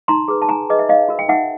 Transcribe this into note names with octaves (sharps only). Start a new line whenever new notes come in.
D#4 A#5 C6
G#4 B4
A5
D#4 G#5 A#5
G#4 B4 D#5
E5
D#4 D#5 F5
F#4 A#4
G5
D#4 E5 F#5